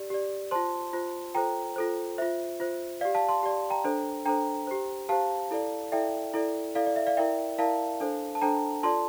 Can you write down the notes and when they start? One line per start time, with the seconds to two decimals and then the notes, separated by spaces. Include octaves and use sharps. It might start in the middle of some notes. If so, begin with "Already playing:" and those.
Already playing: G4 D5
0.10 G4 D5
0.51 F4 C5 A5 C6
0.93 F4 C5
1.35 F4 A4 C5 G5 A#5
1.76 F4 A4 C5
2.18 F4 C5 E5
2.60 F4 C5
3.01 G4 D5 F5
3.15 F5 A5
3.29 A5 C6
3.43 G4 D5
3.70 G5 A#5
3.84 D4 A4 C5
4.26 D4 A4 C5 G5 A#5
4.67 G4 C5
5.09 G4 C5 F5 A5
5.51 E4 A4 D5
5.92 E4 A4 D5 E5 G5
6.34 E4 A4 D5
6.75 E4 A4 D5 F5
6.86 D5
6.96 E5
7.07 D5 F5
7.17 E4 A#4 D5 E5 G5
7.58 E4 A#4 D5 F5 A5
8.00 D4 A4 C5
8.35 A5
8.41 D4 A4 C5 G5 A#5
8.83 F4 A4 D5 A5 C6